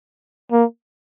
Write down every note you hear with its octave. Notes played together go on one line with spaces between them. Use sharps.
A#3